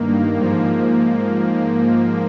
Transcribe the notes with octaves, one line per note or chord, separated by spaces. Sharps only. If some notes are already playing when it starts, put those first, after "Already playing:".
Already playing: G2 D#3 A#3
G#2 F3